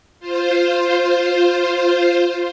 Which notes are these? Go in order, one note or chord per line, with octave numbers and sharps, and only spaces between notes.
F4 C5